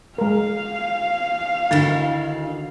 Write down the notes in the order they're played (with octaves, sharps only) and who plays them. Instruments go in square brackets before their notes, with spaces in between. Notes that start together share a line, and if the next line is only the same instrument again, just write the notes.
[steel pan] G#3 A#4 [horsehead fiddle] F5
[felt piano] D2 A6 [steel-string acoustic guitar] D#3 D#4 E4